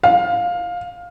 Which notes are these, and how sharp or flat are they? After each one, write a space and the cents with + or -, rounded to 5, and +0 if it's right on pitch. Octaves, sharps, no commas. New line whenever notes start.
F5 +15